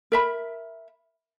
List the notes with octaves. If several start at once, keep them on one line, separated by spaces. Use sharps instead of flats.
A#4 E5 B5